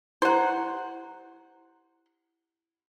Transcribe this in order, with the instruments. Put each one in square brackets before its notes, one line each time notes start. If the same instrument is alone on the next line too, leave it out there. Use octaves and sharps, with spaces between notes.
[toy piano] E4 G4 A#5 [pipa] C5 F#5